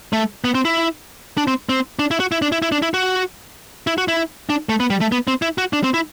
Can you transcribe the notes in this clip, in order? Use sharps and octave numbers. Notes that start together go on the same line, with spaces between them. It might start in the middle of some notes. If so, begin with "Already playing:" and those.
A3
B3
C4
E4
D4
C4
C4
D4
E4
F#4
E4
D4
E4
E4
D4
E4
F#4
E4
F#4
E4
D4
A3
B3
G3
A3
B3
C4
E4
F#4
D4
C4
E4